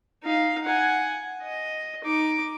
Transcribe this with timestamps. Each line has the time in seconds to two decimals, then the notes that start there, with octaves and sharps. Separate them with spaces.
0.23 D#4 F5
0.64 F#5 G#5
1.43 D#5
2.04 D#4 D6